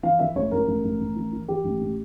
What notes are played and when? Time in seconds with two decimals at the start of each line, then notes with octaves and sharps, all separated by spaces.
0.03 E3 F5
0.19 E3 E5
0.36 A1 C#5
0.51 A1 A#4
0.68 A1
0.84 A1
1.01 A1
1.16 E3
1.33 E3
1.48 E3 G4
1.64 A1
1.81 A2